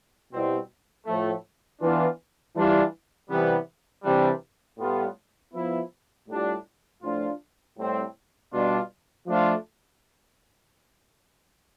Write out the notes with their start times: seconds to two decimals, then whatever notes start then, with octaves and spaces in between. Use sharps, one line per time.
0.31 B2 G3 C4 E4
1.06 A2 F3 A3
1.80 E3 B3 D4 F4
2.55 E3 G3 D4 F4
3.29 C3 E3 G3 B3
4.04 C3 E3 G3 D4
4.79 A2 G3 B3 F4
5.53 F3 B3 E4
6.28 A2 G3 D4 F4
7.02 A2 F3 A3 D4 F4
7.77 A2 G3 C4
8.52 B2 G3 D4 F4
9.27 F3 A3 D4 F4